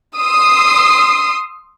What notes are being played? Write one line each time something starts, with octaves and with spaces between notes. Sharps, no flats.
C6 D#6 E6 C7